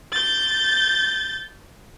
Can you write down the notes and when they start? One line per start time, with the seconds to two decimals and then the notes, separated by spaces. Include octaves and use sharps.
0.13 G6 A6